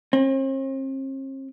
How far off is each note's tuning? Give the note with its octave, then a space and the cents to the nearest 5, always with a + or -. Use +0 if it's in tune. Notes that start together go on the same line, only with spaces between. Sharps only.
C4 +45